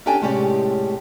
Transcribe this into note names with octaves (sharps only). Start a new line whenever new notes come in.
C#4 D4 G4 A4 G5 G#5
A2 C3 G#3 C#4 G4 D5